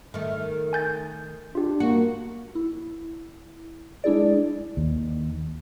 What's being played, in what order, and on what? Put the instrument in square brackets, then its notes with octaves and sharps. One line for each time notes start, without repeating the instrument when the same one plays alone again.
[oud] D#3 A3
[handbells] G#5 G6 A6
[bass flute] D4 [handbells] F4 G4
[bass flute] A#3 [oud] F#4
[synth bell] E4
G#3 D4 E4 G#4 D5
[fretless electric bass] D#2